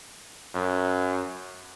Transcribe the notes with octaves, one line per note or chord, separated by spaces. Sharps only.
F#2